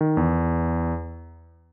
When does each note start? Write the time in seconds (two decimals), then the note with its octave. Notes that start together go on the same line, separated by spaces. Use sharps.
0.01 D#3
0.17 E2